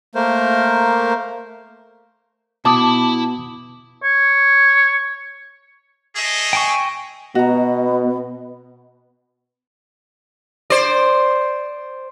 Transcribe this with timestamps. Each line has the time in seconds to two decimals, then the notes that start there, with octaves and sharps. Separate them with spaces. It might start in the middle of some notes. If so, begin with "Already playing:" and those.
0.15 A3 A#3 A#4 C5
2.65 B2 E4 A5 B5 D6 D#6
4.03 C#5
6.16 A3 G#4 D#5
6.53 G5 G#5 C#6
7.35 B2 B3 F#4 D#5 A#5
10.70 C5 D5